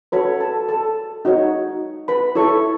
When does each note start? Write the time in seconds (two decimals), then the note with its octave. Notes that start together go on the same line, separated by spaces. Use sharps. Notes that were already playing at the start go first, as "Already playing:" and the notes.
0.12 F#4 A4 B4 C#5 B5
0.40 A4 A5
0.69 A4 A5
1.25 D#4 F#4 C#5
2.08 B4 B5
2.35 E4 A4 C#5 C#6